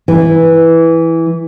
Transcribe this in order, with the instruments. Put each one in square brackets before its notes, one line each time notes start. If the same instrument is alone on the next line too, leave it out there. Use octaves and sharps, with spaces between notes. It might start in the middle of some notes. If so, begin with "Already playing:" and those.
[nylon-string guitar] E3